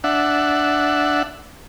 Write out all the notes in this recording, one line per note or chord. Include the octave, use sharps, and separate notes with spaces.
D4 E5 F#5